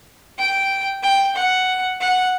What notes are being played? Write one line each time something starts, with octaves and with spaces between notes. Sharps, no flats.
G5
G5
F#5
F#5